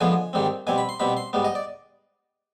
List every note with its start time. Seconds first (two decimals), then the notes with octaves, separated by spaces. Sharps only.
0.01 D3 F3 G#3 B3 G#5
0.33 G#2 D#3 G3 C4
0.67 B2 G3 C4 G#5
0.78 B5
0.89 C6
0.99 B2 G3 C4 B5
1.17 C6
1.33 G#2 G3 B3
1.44 D#5
1.55 D5